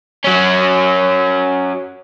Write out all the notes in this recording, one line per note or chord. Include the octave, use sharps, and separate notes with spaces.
F#3 C#4